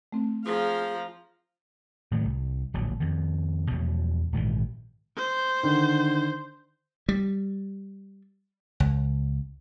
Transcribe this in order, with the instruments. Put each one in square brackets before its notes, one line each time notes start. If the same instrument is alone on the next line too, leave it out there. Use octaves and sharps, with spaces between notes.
[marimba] A3 C4
[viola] F3 [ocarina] G#4 [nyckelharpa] F5 A#5
[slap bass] A2 D#3 F#3
C2
D1 A#1 F#3
F2 D#3
E2 B2 F3 F#3
A#1 G#2 D#3 E3
[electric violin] C5
[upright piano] D3 D#3
[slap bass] G3
C#2